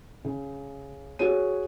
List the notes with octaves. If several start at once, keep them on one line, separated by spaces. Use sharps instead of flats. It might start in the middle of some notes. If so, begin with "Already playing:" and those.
C#3
F#4 G#4 C#5 D#7